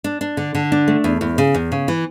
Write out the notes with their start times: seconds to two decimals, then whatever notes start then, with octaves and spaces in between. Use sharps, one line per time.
0.04 D4
0.21 D4
0.37 D3
0.55 D3
0.72 D4
0.88 A3
1.04 E2
1.21 E2
1.38 C#3
1.55 E2
1.72 C#3
1.88 E3